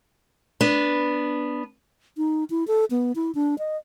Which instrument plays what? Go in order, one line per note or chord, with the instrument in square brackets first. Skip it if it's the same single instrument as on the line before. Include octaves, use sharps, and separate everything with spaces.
[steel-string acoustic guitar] B3 D4
[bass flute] D#4
E4
A4
B3
E4
D4
D#5